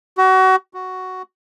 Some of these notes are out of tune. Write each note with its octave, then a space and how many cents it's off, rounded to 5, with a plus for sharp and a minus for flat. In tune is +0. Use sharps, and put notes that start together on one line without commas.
F#4 +30
F#4 +5